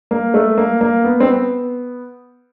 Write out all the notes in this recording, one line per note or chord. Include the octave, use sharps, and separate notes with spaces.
A#3
A3
A#3
A#3
B3
C4
B3